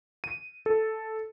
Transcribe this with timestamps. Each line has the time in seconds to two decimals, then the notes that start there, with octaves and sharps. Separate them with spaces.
0.24 D#7
0.66 A4